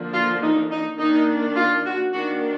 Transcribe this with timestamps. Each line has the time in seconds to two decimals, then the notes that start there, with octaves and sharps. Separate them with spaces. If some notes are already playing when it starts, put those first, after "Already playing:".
Already playing: D3 F3 A#3 D4
0.14 F4
0.43 D#4
0.71 D#4
0.99 D#3 A#3 D4 D#4
1.56 F4
1.85 F#4
2.13 D#3 A#3 D4 F#4